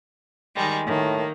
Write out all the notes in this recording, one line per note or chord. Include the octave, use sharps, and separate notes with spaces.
D#3 G3 G#3
A2 D#3 A#3